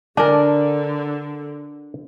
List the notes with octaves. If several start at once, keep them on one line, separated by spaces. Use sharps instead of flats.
D3 D4 A#4 D5 G#5 A5